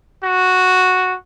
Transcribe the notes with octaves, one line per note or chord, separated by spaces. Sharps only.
F#4